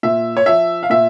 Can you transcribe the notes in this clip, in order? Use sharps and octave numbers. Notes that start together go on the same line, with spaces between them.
A#2 E5
C#5
F3 E5
F5
A#2 E5